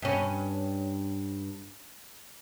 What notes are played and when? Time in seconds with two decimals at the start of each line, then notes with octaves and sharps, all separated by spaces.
0.02 G2 C#4